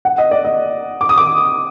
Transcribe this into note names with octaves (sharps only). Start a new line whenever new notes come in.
F#5
D#5
D5
D#5
D6
D#6
D6